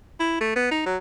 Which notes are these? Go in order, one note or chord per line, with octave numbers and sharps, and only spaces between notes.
E4
A3
B3
D#4
F#3